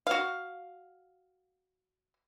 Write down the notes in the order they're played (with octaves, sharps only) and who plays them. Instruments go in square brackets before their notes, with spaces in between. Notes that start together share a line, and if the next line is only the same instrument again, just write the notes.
[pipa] F#4 F5